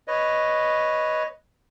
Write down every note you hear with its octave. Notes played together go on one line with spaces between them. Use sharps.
B4 C#5 D#5